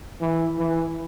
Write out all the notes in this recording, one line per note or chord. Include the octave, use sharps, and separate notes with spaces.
E3
E3